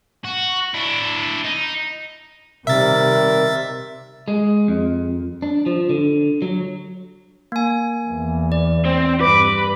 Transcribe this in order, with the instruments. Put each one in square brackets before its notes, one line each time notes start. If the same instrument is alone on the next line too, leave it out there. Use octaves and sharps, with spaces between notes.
[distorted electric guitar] F#4
D4 E4
D#4
[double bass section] C3 [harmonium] D#3 G3 A#4 [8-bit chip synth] E5 A6
[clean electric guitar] G#3
F2
D4
F3
D3
F#3
[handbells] A#3 G#5
[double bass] E2 E3
[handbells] D5
[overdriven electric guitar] C4
[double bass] G2 [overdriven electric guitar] B4 [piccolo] D6